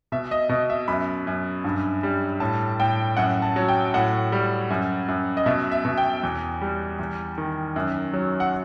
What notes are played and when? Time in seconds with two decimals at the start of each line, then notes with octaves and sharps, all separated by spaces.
0.12 B2 E5
0.31 D#5
0.49 B2 D#5
0.70 E5
0.88 F#2 B5
1.27 F#2
1.64 G2
2.03 G3
2.40 A2 A5
2.80 A2 G5
3.17 F#2 F#5
3.42 A5
3.56 F#3
3.69 G5
3.94 A2 F#5
4.32 G3
4.70 F#2
5.08 F#2
5.37 D#5
5.46 B2 E5
5.71 E5
5.85 B2
5.98 G5
6.23 E2
6.61 G3
6.99 E2
7.38 D#3
7.76 F#2
8.13 F#3
8.40 F#5